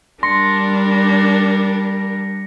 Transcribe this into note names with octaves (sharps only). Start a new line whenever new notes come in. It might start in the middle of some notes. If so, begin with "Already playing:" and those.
G3 D4 A#4 C6 A#6 C#7